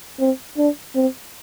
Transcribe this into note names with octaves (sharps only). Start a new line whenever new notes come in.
C4
D4
C4